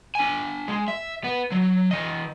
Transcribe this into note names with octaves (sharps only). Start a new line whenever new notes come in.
D4 G#5
G#3
E5
B3
F#3
E3 D#5